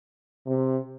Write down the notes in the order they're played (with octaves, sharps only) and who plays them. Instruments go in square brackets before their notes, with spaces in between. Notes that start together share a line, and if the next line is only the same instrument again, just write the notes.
[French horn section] C3